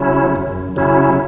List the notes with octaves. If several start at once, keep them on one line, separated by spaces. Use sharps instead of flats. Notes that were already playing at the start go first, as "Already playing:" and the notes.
Already playing: C#3 F#3 C#4 E4
F#2
C#3 F#3 C#4 E4